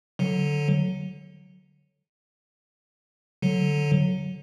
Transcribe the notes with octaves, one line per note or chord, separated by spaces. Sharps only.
D3 F#3
D3 F#3